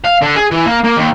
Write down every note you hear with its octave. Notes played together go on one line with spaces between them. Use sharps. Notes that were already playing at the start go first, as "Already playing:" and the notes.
F5
D3
G#4
E3
A#3
A#3
D#2